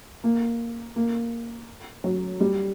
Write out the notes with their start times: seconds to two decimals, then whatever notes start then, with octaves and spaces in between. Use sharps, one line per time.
0.24 A#3
0.96 A#3
2.04 F#3
2.40 G3